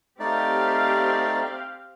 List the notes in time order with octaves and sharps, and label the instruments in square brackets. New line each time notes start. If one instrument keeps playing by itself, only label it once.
[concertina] A3 D#4 D5 [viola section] C4 G4 F5